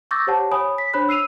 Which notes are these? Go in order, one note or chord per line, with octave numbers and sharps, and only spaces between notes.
C#6 D6 E6 G6 A6 A#6
G4 C5 C#5 F#5 A5
C#5 G#5 B5 D#6
B6
D4 C5 C#5 B5 F#6
E6 C7 D#7 F7